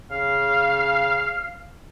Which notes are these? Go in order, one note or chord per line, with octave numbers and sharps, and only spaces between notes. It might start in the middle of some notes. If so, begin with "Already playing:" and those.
C#3 F5